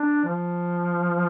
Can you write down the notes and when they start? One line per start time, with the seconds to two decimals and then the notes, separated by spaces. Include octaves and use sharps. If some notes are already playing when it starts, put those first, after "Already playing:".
Already playing: D4
0.25 F3